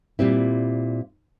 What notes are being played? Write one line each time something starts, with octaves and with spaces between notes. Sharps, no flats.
A#2 G3 C4 E4